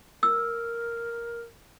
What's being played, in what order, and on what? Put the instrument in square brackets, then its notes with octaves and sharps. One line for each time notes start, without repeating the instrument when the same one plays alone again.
[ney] A#4 [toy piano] E6